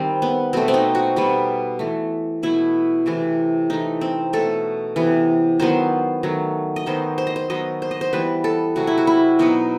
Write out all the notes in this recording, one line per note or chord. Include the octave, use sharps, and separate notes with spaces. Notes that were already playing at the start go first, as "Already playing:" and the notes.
Already playing: D#3 G3 C4
B3
B2 A3 C4
C4
D#4
F#4
B2 G3 B3
E3 A3
B2 A3 E4
C3 E3 A3
E3 A3 D#4
C4
B2 A3 A4
C3 E3 B3
D#3 F#3 B3 C5
D#3 F#3 A3
D#5
D#3 F#3 B3 C5
C5
D#5
C5
D#3 F#3 B3 D#5
C5
D#5
C5
E3 G3 B3 B4
A4
C3 F#3 A3 F#4
E4
F#4
E4
B2 F#3 B3 D#4